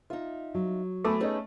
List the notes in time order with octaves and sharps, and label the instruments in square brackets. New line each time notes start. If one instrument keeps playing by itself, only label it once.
[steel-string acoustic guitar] D#4 E5 [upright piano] F4
[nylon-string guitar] F#3
[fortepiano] A3 [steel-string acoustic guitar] B3 F#4 G#5 [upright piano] B5 D6
[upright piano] C#4 D#5 [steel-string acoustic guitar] D#4 G#4 B4